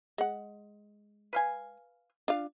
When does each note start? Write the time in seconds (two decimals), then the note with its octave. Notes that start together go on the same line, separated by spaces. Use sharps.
0.18 G#3 F#5
1.33 B4 F5 G#5
2.28 D4 F4 F5